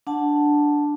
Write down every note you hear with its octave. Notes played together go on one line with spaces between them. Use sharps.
D4 F#5 A5